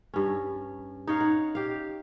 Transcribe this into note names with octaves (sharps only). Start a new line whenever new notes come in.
G2 C#4
D#4 C#5 F5
F#5
G4 F5